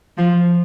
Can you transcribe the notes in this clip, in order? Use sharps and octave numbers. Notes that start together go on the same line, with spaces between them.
F3